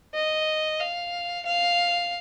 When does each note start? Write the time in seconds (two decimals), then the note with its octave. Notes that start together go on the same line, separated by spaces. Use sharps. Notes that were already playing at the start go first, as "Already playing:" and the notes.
0.15 D#5
0.80 F5
1.46 F5